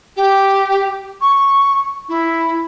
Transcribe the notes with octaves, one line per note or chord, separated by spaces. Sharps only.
G4
C#6
E4